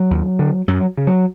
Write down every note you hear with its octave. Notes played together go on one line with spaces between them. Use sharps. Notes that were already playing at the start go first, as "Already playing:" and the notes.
Already playing: F#3
D#2
D3
F#2 F#3
C#3
F#3